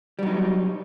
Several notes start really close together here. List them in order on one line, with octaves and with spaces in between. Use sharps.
G3 F#3 D#4